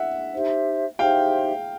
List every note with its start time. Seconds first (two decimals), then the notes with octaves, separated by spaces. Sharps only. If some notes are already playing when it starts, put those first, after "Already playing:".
Already playing: E5 F#5
0.33 D#4 G4 C5 E5
0.99 D#4 G4 C5 E5 F5 G5